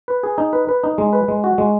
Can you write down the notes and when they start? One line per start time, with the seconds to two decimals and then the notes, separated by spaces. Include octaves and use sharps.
0.08 B4
0.23 G#4
0.38 D#4
0.53 B4
0.69 B4
0.84 D#4
0.98 G#3
1.13 B4
1.28 G#3
1.44 F#4
1.58 G#3